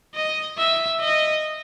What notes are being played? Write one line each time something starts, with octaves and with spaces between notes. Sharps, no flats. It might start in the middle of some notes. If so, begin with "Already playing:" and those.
D#5
E5
D#5